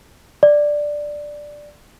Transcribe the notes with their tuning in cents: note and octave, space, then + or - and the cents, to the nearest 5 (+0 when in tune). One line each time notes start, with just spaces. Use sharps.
D5 +5